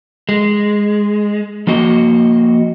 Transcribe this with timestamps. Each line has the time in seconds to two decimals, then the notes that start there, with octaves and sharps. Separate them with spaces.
0.29 G#3
1.67 F3 A#3 F#4 D#5